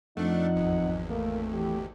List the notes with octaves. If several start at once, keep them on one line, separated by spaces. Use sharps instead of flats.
F2 F3 A3 D4 D#4 F#5
G#1 E2
A3 A#3
E3 G4